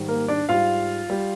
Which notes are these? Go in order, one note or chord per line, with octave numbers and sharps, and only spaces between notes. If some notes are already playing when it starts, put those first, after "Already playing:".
Already playing: G#2 D#3 G3
A#3 A#4
D4 D5
G#2 G3 F4 F5
G3